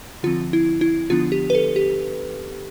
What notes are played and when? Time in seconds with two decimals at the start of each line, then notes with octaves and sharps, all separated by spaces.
0.23 D3 F3 C4 F4
0.53 E4
0.81 E4
1.10 D3 F3 B3 D4 F4
1.32 G4
1.50 B4
1.55 A4
1.76 G4